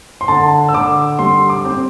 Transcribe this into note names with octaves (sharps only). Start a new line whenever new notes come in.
C6
D3 A5
E6
D3 D6
G3 C6
D6
C4